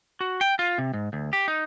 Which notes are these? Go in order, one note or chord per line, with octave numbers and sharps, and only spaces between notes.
F#4
G5
F4
C3
G#2
D2
G4
D#4